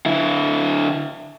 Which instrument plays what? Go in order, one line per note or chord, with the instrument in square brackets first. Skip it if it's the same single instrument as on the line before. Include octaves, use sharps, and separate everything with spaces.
[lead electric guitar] D3 E4